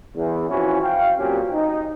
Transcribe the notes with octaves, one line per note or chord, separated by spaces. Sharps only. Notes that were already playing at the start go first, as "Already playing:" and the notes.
E2
E3 F3 C4 C#4 F#4
F5 G5
A#2 F#3 C4 C#4 F#4 G4
D#4